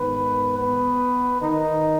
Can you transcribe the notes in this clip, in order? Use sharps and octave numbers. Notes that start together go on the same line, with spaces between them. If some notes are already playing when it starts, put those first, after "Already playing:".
Already playing: G#2 D#3 B3 B4
B3 B4
D#3 D#4